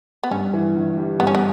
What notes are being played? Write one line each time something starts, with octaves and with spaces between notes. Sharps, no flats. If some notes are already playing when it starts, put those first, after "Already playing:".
B3
G2 C#4
E3
G1
G3
G2 B3
C#4
B3